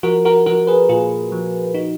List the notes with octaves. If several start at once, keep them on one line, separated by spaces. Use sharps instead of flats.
F3 F#4 A#4
F#4 A#4
F3 F#4 A#4
G#4 B4
A#2 F4 G#4
F3
D#4 F#4